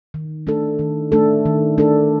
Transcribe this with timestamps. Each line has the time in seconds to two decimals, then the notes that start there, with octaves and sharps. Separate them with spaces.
0.14 D#3
0.47 A3 D4 A4
0.79 D#3
1.12 A3 D4 A4
1.46 D#3
1.78 A3 D4 A4